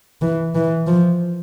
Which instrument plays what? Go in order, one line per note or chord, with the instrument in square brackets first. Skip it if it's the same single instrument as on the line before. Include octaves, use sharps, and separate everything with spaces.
[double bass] E3
E3
F3